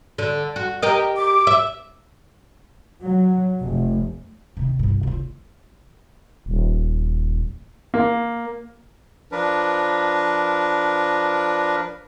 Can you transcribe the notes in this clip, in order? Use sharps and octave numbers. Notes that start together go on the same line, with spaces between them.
D3
F#4
G4 A#4 D#5
D6
E5
F#3
F1
C3 D#3
C2 G2
C#3 F4
D#1
A#3
F3 D4 A#4 B4